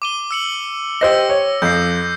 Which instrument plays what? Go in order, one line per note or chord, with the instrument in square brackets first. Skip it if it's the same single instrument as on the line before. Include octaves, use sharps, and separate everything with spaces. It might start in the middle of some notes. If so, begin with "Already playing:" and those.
[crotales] D6 D#7 G7
E6 C#7 F#7
[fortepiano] G4 C5 D#5 [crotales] E6 A#6
[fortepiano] C#5
[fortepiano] F2 [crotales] G6 C7